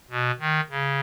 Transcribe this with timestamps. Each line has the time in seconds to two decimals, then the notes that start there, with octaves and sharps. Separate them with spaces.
0.11 B2
0.40 D#3
0.70 C#3